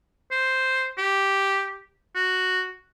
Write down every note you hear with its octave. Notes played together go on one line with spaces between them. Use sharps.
C5
G4
F#4